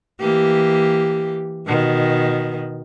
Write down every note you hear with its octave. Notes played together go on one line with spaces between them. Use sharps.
E3 A#3 G4
B2 D#3